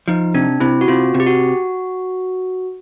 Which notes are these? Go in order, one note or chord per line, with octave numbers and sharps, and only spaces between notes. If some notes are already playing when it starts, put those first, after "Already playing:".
F3 D#4
C3 D4
C3 E4
F#4
C3 F4
C3
G4
F#4